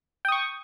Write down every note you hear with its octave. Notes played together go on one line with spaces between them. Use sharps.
G5 C#6 D#6